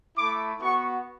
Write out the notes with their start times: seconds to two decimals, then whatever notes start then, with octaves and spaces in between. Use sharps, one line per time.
0.17 A3 E4 D6
0.62 B3 F#4 C#6